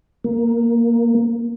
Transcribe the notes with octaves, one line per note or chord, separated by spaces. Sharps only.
A#3